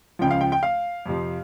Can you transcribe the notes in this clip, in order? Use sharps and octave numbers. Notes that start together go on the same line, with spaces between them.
C#2 C#3 F3 G5
F5
G5
G5
F5
F2 C3 F3